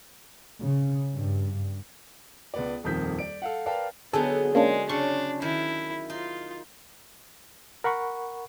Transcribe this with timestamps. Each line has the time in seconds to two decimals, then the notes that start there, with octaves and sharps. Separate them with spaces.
0.64 C#3
1.14 G2
2.54 C#2 B3 D5
2.84 D#1 F2 D#3 G6 B6
3.19 D5 D7
3.42 A4 F5 F#5
3.66 A#4 B4 D5 F5 G5 A5
4.13 D3 F#3 B3 D#4 G#4 A4
4.55 G#3 A#3 C#4 D4
4.89 C#3 D4 C6 C#6
5.42 D#3 E4
6.10 D#4 F4
7.84 A#4 F#5 B5 C#6